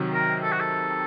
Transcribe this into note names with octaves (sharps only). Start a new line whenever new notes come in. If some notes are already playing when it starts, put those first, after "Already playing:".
Already playing: C3 D#3 F#3
A#4
A4
F#4
A4